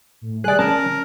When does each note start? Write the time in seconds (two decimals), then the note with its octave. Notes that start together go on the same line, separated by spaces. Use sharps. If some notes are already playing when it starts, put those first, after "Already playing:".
0.21 A2
0.44 G3 G#4 D5 F#6
0.59 C#4 A#4 A5